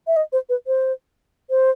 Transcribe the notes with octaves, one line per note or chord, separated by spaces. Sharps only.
E5
D#5
C5
B4
C5
C5